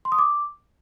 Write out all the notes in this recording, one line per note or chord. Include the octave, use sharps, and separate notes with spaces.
C6
D#6
D6